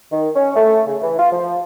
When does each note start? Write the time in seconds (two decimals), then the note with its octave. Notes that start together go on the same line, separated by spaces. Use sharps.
0.12 D#3
0.36 C#4
0.55 A3
0.86 C#3
1.02 E3
1.19 F4
1.32 F3